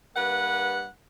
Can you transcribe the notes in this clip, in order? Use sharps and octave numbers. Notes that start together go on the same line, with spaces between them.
G2 A#3 B4 F#5